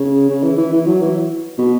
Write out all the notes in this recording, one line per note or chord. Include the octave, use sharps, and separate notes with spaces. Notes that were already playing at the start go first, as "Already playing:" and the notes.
Already playing: C#3
C#3
E3
E3
E3
F#3
E3
B2